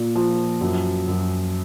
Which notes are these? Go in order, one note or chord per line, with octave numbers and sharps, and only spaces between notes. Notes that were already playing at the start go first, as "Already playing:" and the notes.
Already playing: A#2
F3
F#2
F#2